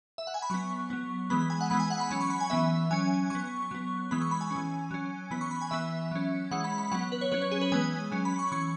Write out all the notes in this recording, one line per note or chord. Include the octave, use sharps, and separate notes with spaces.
E5
F#5
G#5
B5
F#3 B3 C#6
F#3 B3
E3 G#3 B3 B5
B5
G#5
F#5
E3 G#3 B3 B5
G#5
F#5
B5
F#3 C#4 B5
C#6
B5
G#5
E3 B3 E5
F#3 C#4 G#5
F#3 B3 C#6
F#3 B3
E3 G#3 B3 B5
C#6
B5
G#5
E3 C#4
F#3 C#4
E3 B3 B5
C#6
B5
G#5
E3 B3 E5
F#3 C#4
E3 G#3 C#4 F#5
B5
B5
F#3 B3 F#5
B4
C#5
F#3 C#4 B4
C#5
G#4
B4
E3 G#3 B3 G#5
F#3 C#4
B5
C#6
E3 C#4 C#6